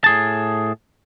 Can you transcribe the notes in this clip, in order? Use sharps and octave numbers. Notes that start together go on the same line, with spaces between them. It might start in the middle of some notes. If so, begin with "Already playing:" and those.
A2 G#4 A5